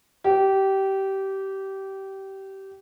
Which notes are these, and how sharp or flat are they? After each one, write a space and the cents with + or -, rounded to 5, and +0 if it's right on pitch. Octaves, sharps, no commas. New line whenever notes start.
G4 -20